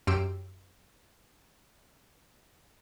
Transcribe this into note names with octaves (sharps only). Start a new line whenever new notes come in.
F#2 G4 C6 E6 D7